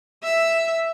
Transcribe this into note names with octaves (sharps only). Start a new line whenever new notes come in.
E5